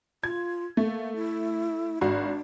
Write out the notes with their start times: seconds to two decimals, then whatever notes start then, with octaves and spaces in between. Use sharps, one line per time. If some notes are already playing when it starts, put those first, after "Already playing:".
0.23 F4 G#6
0.77 A3 A#3
1.16 E4
2.01 G#1 D4 F#4